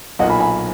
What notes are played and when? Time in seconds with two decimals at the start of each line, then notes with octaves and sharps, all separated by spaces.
0.19 B1 A#2 A#3 D#5 F#5
0.30 G#5 B5
0.40 G#5 B5